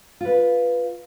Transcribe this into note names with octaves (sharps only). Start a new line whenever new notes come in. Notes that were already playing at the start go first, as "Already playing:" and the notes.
F4 B4